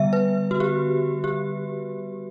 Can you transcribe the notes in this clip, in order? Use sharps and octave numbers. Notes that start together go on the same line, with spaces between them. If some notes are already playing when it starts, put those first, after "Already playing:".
Already playing: D3 G3 B3 E5
B4
F#4
G4
G4